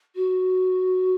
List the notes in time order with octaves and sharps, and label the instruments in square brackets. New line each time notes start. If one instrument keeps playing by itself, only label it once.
[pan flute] F#4